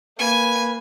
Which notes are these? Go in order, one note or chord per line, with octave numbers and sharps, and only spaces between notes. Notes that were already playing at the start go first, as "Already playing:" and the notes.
A#3 B4 G#5